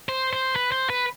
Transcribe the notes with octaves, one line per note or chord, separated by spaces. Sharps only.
C5
C5
B4
C5
B4